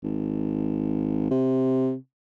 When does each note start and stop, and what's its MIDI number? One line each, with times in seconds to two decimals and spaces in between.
0.03 1.31 32
1.31 1.95 48